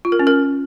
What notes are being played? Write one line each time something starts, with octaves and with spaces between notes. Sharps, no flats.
F4
A#4
C#4
A#4